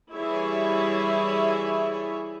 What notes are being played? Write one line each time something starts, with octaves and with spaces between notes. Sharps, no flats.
E3 G3 E4 G#4 C#5 E5